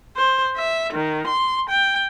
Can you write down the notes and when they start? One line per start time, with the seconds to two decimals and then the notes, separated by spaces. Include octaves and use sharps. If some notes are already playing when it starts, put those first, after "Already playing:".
0.16 C5
0.57 E5
0.94 D#3
1.27 C6
1.70 G5